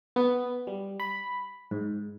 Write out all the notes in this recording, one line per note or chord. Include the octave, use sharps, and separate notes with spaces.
B3
G3
B5
G#2